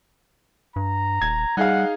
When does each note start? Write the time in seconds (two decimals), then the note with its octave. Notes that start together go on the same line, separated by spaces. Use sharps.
0.76 G2 A#5
1.21 D#1 G#6
1.57 G3 D#4 G#4 F5 F#5